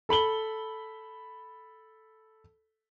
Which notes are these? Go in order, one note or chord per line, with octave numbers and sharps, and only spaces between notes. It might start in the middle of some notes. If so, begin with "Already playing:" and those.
A4 B5 F#7 G7